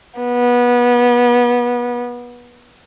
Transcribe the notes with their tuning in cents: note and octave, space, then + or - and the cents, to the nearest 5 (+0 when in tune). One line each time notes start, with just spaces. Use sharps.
B3 -25